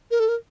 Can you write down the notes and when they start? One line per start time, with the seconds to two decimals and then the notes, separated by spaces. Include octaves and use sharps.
0.11 A#4
0.20 A4
0.29 A#4